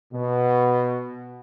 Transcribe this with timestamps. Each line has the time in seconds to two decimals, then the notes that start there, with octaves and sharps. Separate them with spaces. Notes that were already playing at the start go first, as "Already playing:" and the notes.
0.13 B2